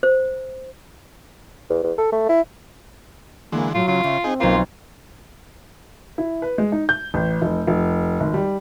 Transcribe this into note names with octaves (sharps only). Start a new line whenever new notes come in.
C5
E2
E2
A4
A3
E4
D3 E3 G#3 A#3
A2 F#3 F4
C#3 F4
C#3 E5
C4 D#4 G#4
B1 A#3 F4 C5
E4
B4
G#3
D#4
G6
A1
F1
F1
G#1
G3